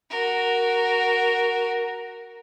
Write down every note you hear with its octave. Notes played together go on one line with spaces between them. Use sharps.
F#4 A#4